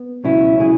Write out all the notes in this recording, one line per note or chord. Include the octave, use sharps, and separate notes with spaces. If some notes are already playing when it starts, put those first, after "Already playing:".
Already playing: B3
C#2 B2 F#3 C#4 E4
C#3 F#3 E4 G#4